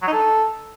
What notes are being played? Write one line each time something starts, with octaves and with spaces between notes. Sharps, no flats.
F#3
D#4
A4